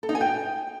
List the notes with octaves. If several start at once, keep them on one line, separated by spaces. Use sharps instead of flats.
A4
D#4
G#5
G5